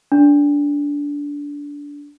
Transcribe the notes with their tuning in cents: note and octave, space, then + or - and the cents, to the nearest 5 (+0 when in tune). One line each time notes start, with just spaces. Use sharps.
D4 -20